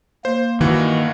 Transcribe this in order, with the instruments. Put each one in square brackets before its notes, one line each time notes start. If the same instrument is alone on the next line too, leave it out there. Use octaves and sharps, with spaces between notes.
[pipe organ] A#3 [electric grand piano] C5
[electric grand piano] G2 E3 F#4 [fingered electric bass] D#3